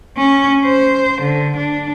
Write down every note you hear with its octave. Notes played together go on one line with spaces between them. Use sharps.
C#4
C5
D3
D4